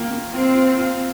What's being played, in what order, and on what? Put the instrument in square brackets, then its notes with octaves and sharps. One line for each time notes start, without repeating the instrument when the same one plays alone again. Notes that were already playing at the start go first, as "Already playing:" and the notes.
Already playing: [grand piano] D#3 A#3 F4
A#3
[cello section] C4 [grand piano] F4
[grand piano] F4
F4